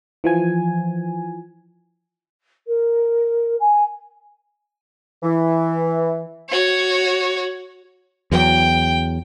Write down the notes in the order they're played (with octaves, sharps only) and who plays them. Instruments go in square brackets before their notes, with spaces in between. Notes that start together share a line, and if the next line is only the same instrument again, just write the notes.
[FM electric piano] E3 F3 G#5
[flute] A#4
G#5
[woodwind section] E3
[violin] F#4 C#5
[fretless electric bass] E2 F#3 [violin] G5